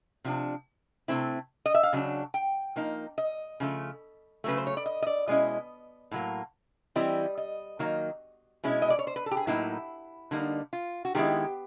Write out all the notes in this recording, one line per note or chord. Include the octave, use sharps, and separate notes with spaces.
C3 F3 D4
C3 F3 A3 C4 E4
D#5
E5
F5
C#3 F#3 D4
G5
F3 A#3 D#4
D#5
C#3 F3 A3
C#3 F#3 A3 B4
C5
C#5
D5
D#5
D#5
D5
B2 G#3 C#4 E4 D#5
A2 F#3 A#3
E3 G3 C4 E4 D#5
D#5
D#3 F#3 A#3 D#4
B2 G#3 C#4 E4
D#5
D5
C#5
C5
B4
A4
G4
G#4
A2 F#3 A#3 D#4 E4
D3 G3 A#3 D#4
F4
F#4
D#3 G#3 B3 E4 G4